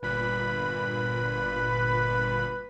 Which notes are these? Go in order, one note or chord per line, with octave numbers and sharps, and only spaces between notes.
G1 A#2 B4 B5